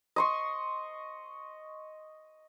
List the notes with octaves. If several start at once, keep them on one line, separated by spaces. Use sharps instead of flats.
D#5 C6 C#6